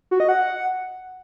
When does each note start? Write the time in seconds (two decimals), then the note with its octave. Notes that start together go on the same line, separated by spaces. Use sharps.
0.11 F#4
0.20 D#5
0.29 F#5